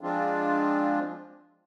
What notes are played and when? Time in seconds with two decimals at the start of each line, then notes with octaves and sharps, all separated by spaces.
0.01 F3 G#3 C4 D4 F4